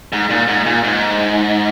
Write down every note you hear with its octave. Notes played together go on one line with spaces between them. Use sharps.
G#2
A#2
G#2
A#2
G#2